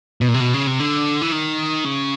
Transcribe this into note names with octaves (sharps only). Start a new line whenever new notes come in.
B2
A#2
C3
B2
C#3
C3
D3
E3
D#3
C#3